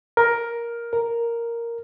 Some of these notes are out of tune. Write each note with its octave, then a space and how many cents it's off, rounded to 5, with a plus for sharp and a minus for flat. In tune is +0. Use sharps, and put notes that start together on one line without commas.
A#4 +10
A#4 +0